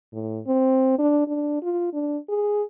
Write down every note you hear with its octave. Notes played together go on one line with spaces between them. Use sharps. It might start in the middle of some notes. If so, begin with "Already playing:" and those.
A2
C4
D4
D4
F4
D4
G#4